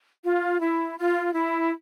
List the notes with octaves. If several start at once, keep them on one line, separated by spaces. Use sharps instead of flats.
F4
E4
F4
E4